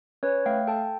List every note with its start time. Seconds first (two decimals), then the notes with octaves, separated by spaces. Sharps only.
0.23 C#4 B4 C#5
0.46 A3 F5 G5
0.67 A4 G5 A5